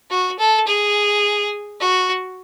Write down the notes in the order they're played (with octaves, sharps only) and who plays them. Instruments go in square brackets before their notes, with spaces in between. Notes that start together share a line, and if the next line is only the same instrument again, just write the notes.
[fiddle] F#4
A4
G#4
F#4